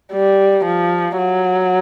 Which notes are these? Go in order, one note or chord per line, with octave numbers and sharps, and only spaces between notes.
G3
F3
F#3